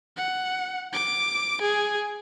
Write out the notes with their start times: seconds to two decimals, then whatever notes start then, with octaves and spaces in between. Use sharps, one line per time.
0.17 F#5
0.93 D6
1.61 G#4